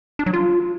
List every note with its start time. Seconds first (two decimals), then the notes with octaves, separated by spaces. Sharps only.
0.19 D4
0.26 F#3
0.33 F4